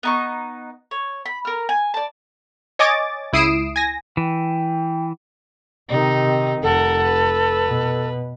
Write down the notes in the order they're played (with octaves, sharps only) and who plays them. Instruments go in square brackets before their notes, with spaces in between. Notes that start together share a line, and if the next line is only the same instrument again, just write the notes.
[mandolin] B3 D#4 C#6
C#5
B5
A#4 F6
G#5
D5 A5
[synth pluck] C#5 D#5 G#5 D6 A6
C#2 E4 D#6 C7 D7 E7
G#5 A#6
[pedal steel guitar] E3 [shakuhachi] G5
[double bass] C3 D#3 [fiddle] D#4
[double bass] F1 [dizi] A4 [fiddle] A#4 F#5
[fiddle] B4
[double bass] B2